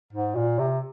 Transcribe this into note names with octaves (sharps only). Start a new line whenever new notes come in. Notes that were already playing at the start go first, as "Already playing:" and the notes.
G#2
A#2
C3